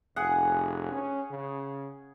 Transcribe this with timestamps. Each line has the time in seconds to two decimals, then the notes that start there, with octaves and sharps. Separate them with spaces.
0.16 F1 G#4 F#5
0.91 C#4
1.31 C#3